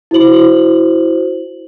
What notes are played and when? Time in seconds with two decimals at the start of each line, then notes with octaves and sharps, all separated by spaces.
0.11 E4 F#4 C5 F#7